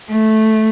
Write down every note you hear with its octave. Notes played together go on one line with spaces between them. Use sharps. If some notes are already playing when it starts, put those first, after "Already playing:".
A3